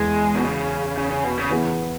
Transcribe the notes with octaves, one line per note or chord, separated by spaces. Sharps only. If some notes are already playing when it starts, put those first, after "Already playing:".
Already playing: E2 G#3
B2
C#3
C#3
C#3
B2
C#3
E3 B3 G#4